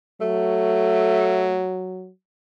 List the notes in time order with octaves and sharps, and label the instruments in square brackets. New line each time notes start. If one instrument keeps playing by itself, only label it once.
[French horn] F#3 [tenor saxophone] A3